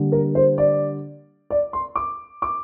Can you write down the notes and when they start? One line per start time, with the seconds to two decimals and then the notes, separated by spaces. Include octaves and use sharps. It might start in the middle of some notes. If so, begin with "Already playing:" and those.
Already playing: D3 G3 A#3
0.12 A#4
0.35 C5
0.58 D5
1.50 D5
1.73 C6
1.96 D6
2.42 D6